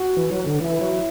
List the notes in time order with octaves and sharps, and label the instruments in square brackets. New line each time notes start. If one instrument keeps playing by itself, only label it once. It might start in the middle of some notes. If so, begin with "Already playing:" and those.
Already playing: [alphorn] F#4
[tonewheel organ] E3
F#3
D3
[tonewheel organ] E3 [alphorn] E4
[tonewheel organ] F#3